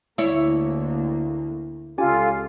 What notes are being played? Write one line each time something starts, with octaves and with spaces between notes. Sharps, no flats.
D2 A#3 E4 C#5
C#2 C#4 F4 G4 A4 G#5